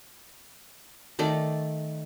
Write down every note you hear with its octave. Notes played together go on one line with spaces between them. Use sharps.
D#3 A3 D5